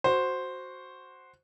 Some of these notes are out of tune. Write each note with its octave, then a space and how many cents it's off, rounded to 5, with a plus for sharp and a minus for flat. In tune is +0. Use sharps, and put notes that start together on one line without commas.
F#4 +0 C5 +0